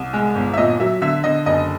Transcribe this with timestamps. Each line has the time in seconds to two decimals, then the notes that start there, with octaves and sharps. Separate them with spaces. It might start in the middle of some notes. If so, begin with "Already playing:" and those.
Already playing: C2
0.13 G#3
0.35 G1
0.53 E5
0.58 A#2 D#5
0.80 F#3 E5
1.02 D3 E5
1.24 D3 D#5
1.46 F#1 D#5